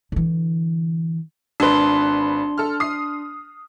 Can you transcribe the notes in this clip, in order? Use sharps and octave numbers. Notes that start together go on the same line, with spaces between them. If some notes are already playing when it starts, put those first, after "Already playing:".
D3 E3
G#1 D4 B4 C6
A4 F6
D#6 C7